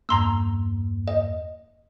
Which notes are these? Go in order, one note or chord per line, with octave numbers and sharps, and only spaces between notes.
E2 G2 A#3 A#5 C6 E6
D#5